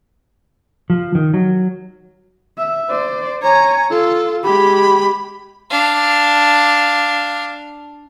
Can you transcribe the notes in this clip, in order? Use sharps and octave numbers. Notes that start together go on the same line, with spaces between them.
F3
D#3
F#3
E5
C5 D5
C#5 G#5 A#5
F4 A4
G#3 G4 B5
D4 F5